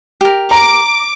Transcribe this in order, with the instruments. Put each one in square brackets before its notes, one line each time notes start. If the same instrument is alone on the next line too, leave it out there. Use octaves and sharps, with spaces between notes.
[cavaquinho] G4 A#4
[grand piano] A#5 [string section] D6